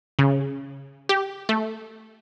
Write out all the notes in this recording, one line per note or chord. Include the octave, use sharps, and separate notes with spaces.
C#3
G4
A3